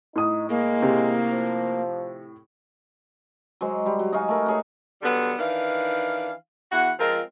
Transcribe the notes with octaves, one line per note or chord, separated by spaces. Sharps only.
A2 D#4 D#6
G#3 A#3
C3
F3
F#3 G#3 C5
G3
F#3
D#4 F#4 F5 G#5
A3 A#4
F#4 G#4 C#5
D3 F#3 G3 B3
D#3 E3 D4 F5
E2 E4 F#4 F#5
F3 G#3 C4 F4 A#4